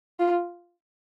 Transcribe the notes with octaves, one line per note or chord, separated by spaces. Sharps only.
F4